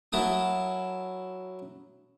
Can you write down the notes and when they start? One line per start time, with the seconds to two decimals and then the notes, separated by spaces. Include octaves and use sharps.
0.12 F#3 E4 A#4 A5 D#6